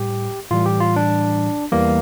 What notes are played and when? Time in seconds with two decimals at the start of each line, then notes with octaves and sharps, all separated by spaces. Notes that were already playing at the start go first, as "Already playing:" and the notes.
Already playing: A2 G3 G4
0.51 A2 E3 G3 F4
0.66 G4
0.80 F4
0.96 D4
1.72 E2 E3 G3 A#3